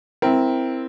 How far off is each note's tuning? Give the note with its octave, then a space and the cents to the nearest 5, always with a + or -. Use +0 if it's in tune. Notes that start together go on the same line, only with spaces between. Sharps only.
C4 +0 E4 +0 A#4 +10